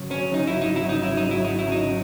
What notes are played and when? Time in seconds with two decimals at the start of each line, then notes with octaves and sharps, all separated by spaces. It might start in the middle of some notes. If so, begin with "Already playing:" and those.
Already playing: G#1 F#2 C#3 F#3
0.11 C#4
0.34 D#4
0.47 E4
0.62 D#4
0.76 E4
0.89 D#4
1.03 E4
1.17 D#4
1.31 E4
1.45 D#4
1.59 E4
1.72 D#4